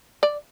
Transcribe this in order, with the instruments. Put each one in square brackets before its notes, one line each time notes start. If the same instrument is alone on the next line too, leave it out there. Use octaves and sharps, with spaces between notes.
[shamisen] D5